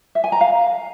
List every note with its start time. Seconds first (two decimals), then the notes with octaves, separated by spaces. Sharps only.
0.15 E5
0.24 G#5
0.32 A#5
0.41 F5